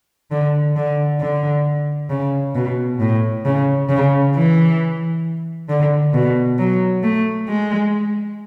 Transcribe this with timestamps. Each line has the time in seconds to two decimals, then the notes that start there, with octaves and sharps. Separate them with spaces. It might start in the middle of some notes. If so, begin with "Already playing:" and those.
0.31 D3
0.76 D3
1.21 D3
2.10 C#3
2.55 B2
3.00 A2
3.45 C#3
3.89 C#3
4.34 E3
5.69 D3
6.13 B2
6.58 F#3
7.03 A3
7.48 G#3